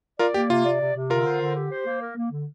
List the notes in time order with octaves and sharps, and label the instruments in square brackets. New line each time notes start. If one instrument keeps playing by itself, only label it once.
[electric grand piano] F4 A#4 [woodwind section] D5
[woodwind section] A#3 [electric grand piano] G4
[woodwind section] C3 [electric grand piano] F4
[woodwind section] D5
C3
C3
[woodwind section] D3 [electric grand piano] F4 A#4
[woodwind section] C5
D3
G4
C5
A#3
A#4
A#3
D3